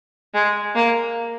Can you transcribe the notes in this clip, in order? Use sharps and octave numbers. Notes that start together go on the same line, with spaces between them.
G#3
A#3